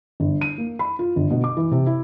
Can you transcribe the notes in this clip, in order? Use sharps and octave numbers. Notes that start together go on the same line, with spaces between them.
G1
D#7
A#3
B5
F4
G1
B2
D6
E3
C3
E4